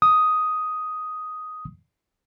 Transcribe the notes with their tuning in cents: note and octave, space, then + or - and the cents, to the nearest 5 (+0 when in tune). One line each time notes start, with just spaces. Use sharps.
D#6 +5